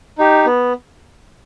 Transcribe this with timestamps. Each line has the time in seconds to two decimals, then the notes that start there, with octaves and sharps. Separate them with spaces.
0.18 D#4 G4
0.46 B3